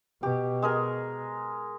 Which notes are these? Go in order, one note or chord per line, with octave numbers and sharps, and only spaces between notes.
B2 G4
G#3 G#4 A#4